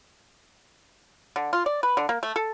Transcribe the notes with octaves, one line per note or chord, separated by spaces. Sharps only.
D3
F4
D5
B4
D3
A#3
A3
A4